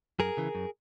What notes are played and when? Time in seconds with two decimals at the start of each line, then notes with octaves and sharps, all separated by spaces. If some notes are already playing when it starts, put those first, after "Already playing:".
0.19 F#2 G#4 A#4
0.37 C#3 E3
0.55 F#2